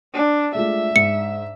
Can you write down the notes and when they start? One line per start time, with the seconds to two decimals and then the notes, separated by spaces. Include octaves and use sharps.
0.14 D4
0.55 G#3 A3 F4 E5
0.96 G#2 C#7